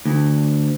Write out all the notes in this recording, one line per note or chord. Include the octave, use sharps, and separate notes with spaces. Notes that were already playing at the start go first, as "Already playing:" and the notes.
D2